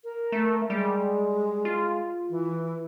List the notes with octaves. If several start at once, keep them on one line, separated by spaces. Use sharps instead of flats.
A#4
A3
G3 G#3
F4
E3